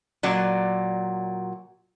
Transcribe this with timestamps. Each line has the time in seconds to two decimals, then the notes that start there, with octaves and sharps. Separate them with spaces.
0.23 A#2 F#3 D5